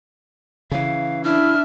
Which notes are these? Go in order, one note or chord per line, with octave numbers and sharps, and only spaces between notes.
C#3 E3 F5
D4 E4 E5 F6